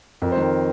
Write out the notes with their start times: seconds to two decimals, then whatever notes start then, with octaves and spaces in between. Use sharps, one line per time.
0.22 F2 A#4
0.32 C5
0.37 D#3 A#4